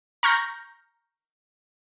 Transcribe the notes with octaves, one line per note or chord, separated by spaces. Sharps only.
A#5 C#6 F6 G6 A#6